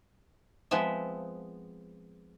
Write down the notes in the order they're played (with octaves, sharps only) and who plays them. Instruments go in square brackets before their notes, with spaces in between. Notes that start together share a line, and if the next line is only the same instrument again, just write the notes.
[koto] F3 G#3 B3 C4 E5